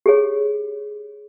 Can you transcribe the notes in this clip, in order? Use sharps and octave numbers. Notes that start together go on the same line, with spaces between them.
G4 G#4 C#5